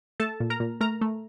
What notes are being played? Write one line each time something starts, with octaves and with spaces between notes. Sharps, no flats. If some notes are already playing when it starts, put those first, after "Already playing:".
A3 A4 A5
A#2
A#4 A#5
A#2
A3 A#4 A#5
A3